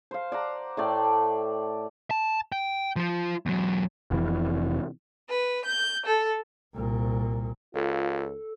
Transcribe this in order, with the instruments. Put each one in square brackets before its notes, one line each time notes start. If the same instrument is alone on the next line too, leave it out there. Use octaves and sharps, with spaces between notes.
[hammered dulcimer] C5 F5
D5 F#5 A#5
A2 A3 D5 G5
[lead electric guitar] A5
G5
F3 F4
E2 F#3
[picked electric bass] F1 F2 C3 E3
[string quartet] B4
G6
A4
[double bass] C2 A#2
[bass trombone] C#2 [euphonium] F4 [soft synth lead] A4